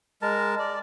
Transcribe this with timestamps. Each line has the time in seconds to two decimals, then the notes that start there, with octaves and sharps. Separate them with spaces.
0.22 G#3 A#4 A5
0.59 D5